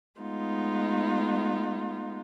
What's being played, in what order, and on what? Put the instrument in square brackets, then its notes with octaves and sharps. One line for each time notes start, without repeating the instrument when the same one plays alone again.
[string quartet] G#3 A3 B3 D#4 F4